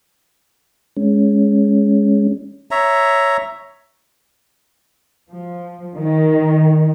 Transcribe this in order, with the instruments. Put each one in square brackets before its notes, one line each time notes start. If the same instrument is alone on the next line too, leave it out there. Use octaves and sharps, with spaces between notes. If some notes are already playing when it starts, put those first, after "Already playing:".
[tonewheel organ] G#3 C#4
[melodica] C#5 E5 A#5
[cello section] F3
D#3